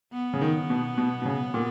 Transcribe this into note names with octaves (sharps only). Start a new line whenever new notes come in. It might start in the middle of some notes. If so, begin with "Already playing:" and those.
B3
C#3
D#3
B2
B2
B2
C#3
A#2